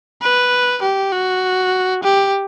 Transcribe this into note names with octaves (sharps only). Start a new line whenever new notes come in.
B4
G4
F#4
G4